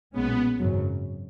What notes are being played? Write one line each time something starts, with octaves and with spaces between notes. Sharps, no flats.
B1 A#2 G#3 B3 C#4
G#1 F#2 C#3 F#3